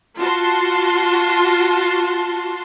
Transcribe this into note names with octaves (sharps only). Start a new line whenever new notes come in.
F4 F#4 A5 C6